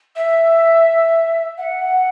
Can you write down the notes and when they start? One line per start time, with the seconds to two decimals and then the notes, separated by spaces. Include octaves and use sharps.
0.15 E5
1.57 F#5